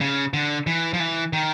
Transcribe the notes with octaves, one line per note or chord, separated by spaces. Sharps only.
C#3
D3
E3
F3
E3
D#3